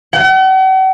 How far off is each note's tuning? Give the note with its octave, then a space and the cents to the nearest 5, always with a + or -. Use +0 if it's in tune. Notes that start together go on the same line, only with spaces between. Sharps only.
F#5 +45